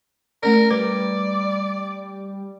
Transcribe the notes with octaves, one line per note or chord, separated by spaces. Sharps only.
A3 C#4 A#4 D5
G3 B4 D5